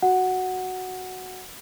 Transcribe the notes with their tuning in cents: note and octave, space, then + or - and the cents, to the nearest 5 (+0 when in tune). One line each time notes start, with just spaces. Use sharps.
F#4 +0 F#5 +0